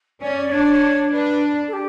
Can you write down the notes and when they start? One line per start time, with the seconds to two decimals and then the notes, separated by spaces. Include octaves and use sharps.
0.21 C#4 D5
0.37 D5
0.52 D4 C#5
0.67 C#5
1.12 D4 B4
1.68 A4
1.73 G4